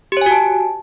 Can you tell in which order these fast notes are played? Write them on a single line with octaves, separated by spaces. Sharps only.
G4 C#5 G#5 F#4 A5